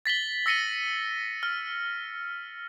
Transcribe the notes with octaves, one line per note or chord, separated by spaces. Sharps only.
A6 B6 F#7 G7
E6 A#6 C#7 D#7 G7
F6